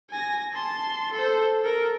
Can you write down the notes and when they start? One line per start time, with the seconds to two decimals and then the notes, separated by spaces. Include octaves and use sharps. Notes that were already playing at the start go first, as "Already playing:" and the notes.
0.10 G#5 A#6
0.53 A5 C6
1.12 A4 C5
1.61 A4 A#4